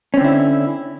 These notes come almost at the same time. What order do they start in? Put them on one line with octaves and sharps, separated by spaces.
C#4 C4 D3 E4